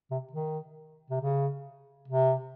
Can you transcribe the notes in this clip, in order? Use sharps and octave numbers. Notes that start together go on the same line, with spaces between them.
C3
D#3
C3
C#3
C3